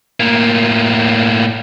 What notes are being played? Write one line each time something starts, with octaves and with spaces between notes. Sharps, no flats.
A2 A#3